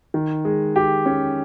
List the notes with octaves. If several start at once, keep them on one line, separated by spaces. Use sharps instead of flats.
D#3
G#3
G4
C#4